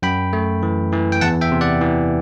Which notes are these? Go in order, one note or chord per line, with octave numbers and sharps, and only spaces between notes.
F#2 G5 B5
A3
E3
E3
G5
E2 F#5 A5
E5 G5
C3
D5 F#5
E3